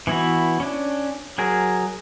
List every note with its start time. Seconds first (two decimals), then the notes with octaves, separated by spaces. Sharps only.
0.07 E3 B3 E4 F#4
0.60 C#4 D4
1.38 F#3 G#4 A#4